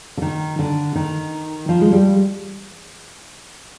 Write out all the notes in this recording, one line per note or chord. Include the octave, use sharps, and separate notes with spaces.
D3
D#3
D3
D#3
F3
G#3
G3